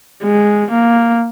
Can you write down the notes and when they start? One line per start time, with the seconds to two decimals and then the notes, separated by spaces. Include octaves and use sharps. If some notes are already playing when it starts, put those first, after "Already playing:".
0.23 G#3
0.71 A#3